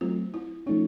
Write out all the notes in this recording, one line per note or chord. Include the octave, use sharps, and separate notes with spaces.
F#3 A3 C4 F4
E4
F3 A3 C#4 D#4